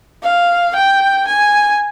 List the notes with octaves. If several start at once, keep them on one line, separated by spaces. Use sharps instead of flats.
F5
G5
G#5